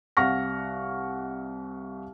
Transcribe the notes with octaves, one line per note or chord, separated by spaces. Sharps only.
C2 F5 F#5 C#6 F6 A#6